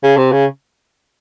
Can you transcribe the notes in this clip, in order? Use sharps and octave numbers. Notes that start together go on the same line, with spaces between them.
C#3
C3
C#3